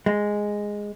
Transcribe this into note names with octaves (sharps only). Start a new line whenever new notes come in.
G#3